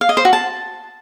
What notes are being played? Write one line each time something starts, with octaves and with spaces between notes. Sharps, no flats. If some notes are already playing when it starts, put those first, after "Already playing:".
F5
D#5
C5
F#4
A5